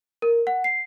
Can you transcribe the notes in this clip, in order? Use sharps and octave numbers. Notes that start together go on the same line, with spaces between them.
A#4
F#5
C7